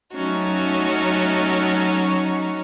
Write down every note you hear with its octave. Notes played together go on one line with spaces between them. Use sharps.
F#3 A3 C#4 D#4 F#4